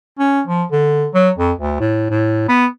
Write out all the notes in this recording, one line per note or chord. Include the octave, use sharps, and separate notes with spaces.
C#4
F3
D3
F#3
F2
D2
A2
A2
B3